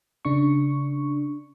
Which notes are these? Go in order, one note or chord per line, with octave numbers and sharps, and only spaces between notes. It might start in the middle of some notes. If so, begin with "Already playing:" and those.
C#3 D4 C#6